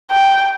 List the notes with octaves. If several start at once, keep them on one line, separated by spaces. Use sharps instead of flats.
G5